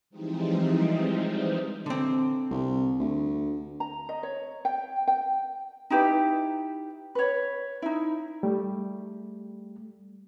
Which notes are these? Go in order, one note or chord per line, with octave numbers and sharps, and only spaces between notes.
E3 F3 G3 G#3 C4 D#4
D3 C4
C2
D2
A#5
D#5
C#5
G5
G5
D#4 E4 G4 B4
B4 C#5
D#4 E4
G3 A3